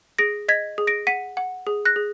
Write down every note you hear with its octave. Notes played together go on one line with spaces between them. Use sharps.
G#4 A#6 D7
D#5 G#6 B6
G#4
A#6 D7
F#5 B6 D#7
F#5
G#4
F#6 A#6
G#4